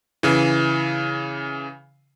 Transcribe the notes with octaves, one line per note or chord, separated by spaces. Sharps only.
C#3 E3